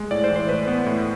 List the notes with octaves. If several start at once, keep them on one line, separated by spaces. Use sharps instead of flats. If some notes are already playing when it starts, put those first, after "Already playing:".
Already playing: G#3
A2 D5
C5
E3
C5
A2 B4
B3
A2